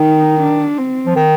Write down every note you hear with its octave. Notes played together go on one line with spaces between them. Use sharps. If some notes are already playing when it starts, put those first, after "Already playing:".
Already playing: D#3 D#4
D4
C4
F3
D#3